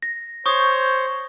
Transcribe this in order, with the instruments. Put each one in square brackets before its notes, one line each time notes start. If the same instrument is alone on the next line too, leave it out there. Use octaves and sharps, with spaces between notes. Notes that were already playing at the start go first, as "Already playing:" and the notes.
[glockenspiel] A#6
[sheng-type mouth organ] C5 C#5 G6 [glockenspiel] C#6 D#6